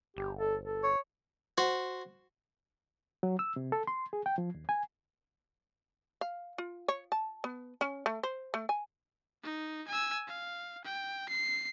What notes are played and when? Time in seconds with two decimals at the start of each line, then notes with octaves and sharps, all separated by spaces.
0.17 G1 G4
0.39 A4
0.65 A4
0.83 C#5
1.58 F#4 C5
3.23 F#3
3.39 E6
3.56 C3
3.72 A4
3.87 C6
4.13 G#4
4.26 G5
4.38 F3
4.54 D#2
4.69 G#5
6.21 F5
6.58 F4
6.88 C#5
7.12 A5
7.44 B3
7.81 C#4
8.06 A3
8.23 C5
8.54 A3
8.69 G#5
9.43 D#4
9.88 G#5 E6
10.27 F5
10.84 G5
11.29 C7